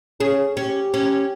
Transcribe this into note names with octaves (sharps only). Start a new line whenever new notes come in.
C#4 G#4
C#4 G4
C#4